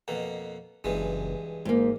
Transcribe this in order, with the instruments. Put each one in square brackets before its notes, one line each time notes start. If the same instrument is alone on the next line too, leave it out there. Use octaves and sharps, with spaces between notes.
[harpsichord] F2 B2 A#3
[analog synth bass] F#1 [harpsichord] G2 E3 G#3
[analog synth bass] G#1 [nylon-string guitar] G#2 A#3